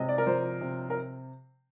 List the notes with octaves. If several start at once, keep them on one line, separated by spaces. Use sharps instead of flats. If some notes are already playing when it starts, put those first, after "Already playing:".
Already playing: C3 G#3 D#5
D5
A#4
F3 C5
C3
A#4